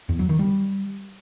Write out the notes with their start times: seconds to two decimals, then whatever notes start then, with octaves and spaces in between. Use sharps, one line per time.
0.09 E2
0.19 F#3
0.29 D#3
0.39 G3